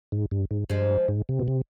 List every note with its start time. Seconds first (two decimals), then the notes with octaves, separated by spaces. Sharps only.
0.12 G#2
0.31 G2
0.51 G#2
0.70 G2 F3 G#3
1.08 G#2
1.29 C3
1.39 B2
1.48 C3